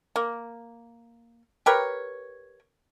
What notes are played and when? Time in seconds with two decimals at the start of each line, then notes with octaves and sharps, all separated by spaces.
0.16 A#3
1.66 G4 A#4 B4 C#5